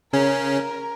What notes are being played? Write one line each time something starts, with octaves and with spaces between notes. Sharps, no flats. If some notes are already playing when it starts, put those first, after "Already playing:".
C#3 C#4 A#4